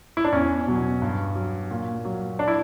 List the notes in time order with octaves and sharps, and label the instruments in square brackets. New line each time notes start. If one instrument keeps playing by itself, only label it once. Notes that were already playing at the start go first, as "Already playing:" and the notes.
[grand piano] E4
D4
E2 C#4
B2 F#3
G2
F#3
A#2
F#3
D4
E4